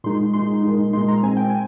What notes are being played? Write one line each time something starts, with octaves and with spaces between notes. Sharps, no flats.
A#2 G#3 D#4 C6
A#2 G#3 D#4 C6
A#2 G#3 D#4
A#2 G#3 D#4 C6
A#5
A#2 G#3 C4 G#5
G5
G#5